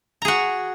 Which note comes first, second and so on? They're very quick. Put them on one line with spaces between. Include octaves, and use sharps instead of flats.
A#5 G#4 F#4